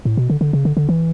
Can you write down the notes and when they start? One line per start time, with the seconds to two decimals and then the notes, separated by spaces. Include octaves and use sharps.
0.05 A2
0.17 B2
0.30 D3
0.41 D3
0.53 C#3
0.65 D3
0.77 D3
0.89 E3